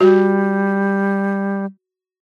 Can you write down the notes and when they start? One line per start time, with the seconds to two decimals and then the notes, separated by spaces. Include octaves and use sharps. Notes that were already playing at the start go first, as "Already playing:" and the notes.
0.01 G3 F#4